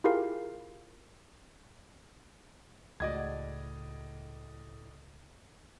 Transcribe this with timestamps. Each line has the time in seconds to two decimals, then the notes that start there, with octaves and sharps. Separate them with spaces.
0.04 E4 F4 G4 G#4 A#4 F5
3.00 C#2 A2 G#3 F#4 D5 D#5 G#6